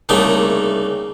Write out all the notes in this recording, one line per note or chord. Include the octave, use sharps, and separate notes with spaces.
C2 C#3 A3 A#3 D#4